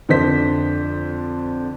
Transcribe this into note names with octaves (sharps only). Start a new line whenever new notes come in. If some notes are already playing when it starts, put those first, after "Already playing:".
F2 D3 D4 C5 B6